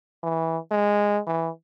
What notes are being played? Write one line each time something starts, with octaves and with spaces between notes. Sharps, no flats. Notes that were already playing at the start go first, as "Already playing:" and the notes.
E3
G#3
E3